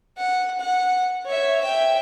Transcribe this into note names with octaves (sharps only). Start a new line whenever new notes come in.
F#5
F#5
C#5 E5
E5 G5